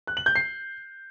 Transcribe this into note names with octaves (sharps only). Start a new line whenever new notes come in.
F#6
F#7
G6
C7